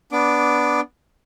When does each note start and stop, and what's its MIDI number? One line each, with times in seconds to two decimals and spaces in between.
0.12 0.80 59
0.12 0.80 62
0.12 0.80 86